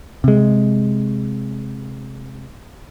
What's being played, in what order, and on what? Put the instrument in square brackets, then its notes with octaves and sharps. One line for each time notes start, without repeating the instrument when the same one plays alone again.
[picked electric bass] C3 G#3